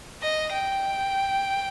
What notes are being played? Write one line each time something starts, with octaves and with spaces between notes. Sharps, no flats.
D#5
G5